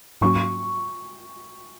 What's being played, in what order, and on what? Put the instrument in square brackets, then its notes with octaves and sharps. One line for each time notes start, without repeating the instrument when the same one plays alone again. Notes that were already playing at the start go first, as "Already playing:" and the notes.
[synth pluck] G#2 F#3 A#3 C#4 F#4 [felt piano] C#6